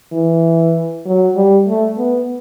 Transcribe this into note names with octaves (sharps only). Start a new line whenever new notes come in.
E3
F#3
G3
A3
B3